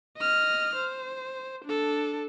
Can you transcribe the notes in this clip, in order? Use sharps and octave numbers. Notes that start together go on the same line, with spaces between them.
D#5 F6
C5
D4 A4